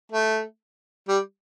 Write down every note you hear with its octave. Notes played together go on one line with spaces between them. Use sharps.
A3
G3